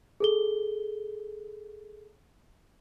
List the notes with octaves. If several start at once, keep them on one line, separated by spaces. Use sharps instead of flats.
G#4 A4 G7